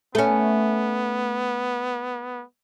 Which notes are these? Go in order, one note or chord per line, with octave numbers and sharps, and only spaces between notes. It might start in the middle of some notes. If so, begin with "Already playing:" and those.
A3 B3 C#4